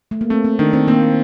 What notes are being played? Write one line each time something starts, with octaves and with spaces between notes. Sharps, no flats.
A3
A#3
A3 C4
C4
D#3 D4
C4
A#3 C4